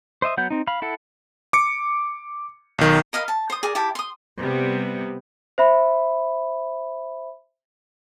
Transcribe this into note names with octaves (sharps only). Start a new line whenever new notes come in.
C5 D#5 E5 D#6
F#3 B3 F#5 G6
C4 D#4
F5 B5
E4 A4 F#5
D6 C#7
B1 D#3
A#4 D#5 F5 B5
A5
C5 D#6
G#4 A#4 D5
E4 G4 A5 B5
C6 D#6
C3 G3 B3
C5 E5 B5